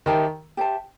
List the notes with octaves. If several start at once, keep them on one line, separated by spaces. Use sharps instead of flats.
D#3 G4 C5 E5 A5
G4 C5 E5 A5